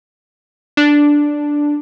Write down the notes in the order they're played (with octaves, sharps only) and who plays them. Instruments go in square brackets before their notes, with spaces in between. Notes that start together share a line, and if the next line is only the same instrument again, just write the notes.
[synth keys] D4